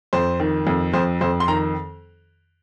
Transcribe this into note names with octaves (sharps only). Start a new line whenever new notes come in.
F2 C5
D#3
F2
F2 C5
F2 C5
C6
D#3 A#5